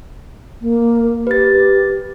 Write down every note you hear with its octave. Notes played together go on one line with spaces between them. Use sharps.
A#3
G4 B4 A6